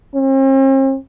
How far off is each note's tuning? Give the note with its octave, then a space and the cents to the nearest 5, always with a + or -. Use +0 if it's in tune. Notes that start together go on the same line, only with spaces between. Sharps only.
C4 +45